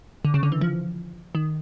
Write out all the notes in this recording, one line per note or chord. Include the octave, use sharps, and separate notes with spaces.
D3
C#3
D3
E3
F3
D#3